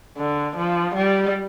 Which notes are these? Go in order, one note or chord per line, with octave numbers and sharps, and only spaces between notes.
D3
F3
G3